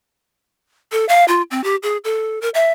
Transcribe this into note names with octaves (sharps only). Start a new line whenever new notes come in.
A4
F5
F4
C4
G4
G#4
A4
A#4
E5